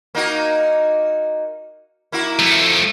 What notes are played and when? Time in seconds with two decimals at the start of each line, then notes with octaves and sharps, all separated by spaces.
0.15 A#3 D#4 F#4
2.12 A#3 E4 F#4
2.39 F3 A3